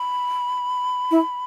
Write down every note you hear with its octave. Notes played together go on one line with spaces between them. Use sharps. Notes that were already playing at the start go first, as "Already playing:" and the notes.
Already playing: B5
E4